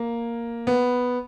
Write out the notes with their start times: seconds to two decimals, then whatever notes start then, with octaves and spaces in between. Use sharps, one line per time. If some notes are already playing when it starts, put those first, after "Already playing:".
Already playing: A#3
0.67 B3